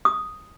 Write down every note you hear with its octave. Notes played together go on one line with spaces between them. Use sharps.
D#6